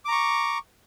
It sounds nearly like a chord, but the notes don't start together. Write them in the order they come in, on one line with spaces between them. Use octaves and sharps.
D6 A#5 C#6